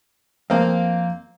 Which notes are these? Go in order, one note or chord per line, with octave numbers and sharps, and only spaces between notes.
F2 A#3 C4 F5